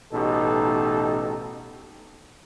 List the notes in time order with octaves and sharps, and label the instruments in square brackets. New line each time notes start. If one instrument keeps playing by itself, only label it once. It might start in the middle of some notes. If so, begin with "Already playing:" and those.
[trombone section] A1 B2 D#4 G4 A4